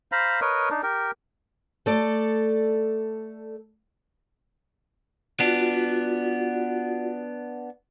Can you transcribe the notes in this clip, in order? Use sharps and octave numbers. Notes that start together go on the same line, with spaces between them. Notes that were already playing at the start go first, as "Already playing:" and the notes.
C5 F5 A#5 B5
A#4 B4 C#5 D#5
D4 D#4
G4 A#4
A3 A4 D5
B3 D4 F4 F#4 D5